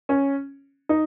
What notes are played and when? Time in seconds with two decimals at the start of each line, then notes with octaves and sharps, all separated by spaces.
0.09 C#4
0.89 D#4